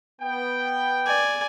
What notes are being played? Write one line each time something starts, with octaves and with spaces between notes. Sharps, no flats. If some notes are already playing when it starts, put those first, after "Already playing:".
B3 G5
D5 G#5